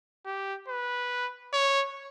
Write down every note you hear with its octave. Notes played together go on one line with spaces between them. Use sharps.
G4
B4
C#5